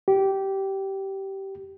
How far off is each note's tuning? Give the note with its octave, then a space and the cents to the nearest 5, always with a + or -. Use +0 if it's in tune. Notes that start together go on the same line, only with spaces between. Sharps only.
G4 -15